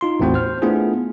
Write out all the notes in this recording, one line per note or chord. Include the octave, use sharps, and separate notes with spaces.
D#4 F4 C6
A1 E2 A2 C4 F#4 C5
C5 F6
A3 B3 D4 E4 F4 G#4